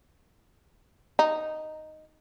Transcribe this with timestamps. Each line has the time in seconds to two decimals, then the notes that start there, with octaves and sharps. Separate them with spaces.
1.19 D#4